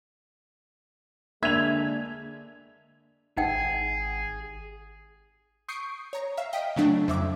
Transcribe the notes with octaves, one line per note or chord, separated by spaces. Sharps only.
D3 G#3 A#3 D4 E5 G#6 F7
G#1 D#4 G#4 F#5 G5
C#6 D#6 G6 C7 D7
C#5 A#5
E5 F5
D#5 G5 B6 D7
C#3 F#3 A3 D4
F2 E5 D6